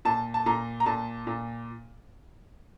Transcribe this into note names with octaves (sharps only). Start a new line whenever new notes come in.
A#2 A5
A5
A#2 A#5
A#5
A#2 A5
A#2